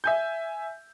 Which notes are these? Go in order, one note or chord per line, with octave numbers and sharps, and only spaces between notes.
E5 G#5 G6